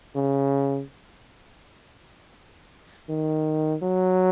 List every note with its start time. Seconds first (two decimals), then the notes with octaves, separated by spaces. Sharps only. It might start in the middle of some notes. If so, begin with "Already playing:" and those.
0.15 C#3
3.09 D#3
3.82 F#3